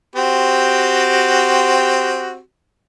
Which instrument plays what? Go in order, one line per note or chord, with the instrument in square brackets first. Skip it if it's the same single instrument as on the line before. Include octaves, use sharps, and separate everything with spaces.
[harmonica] C4 F#4 G4